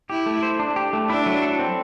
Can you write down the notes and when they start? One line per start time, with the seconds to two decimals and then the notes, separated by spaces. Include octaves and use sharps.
0.10 E4 G4
0.26 A3
0.43 C5
0.59 D4
0.76 G4
0.93 A3
1.09 D4 E4
1.26 F#3
1.42 A4
1.59 C4